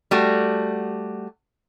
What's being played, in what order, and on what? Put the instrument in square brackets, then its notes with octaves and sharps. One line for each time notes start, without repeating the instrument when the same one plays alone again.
[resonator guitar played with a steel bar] G3 A3 F#4